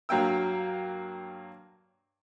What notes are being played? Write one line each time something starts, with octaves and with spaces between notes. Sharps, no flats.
G2 F#3 A#3 G5 E6